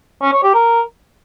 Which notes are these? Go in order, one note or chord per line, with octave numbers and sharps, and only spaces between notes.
C#4
C#5
G4
A#4